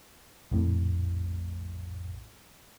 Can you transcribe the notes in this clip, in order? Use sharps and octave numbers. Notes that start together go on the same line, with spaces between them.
A#1 F2 A2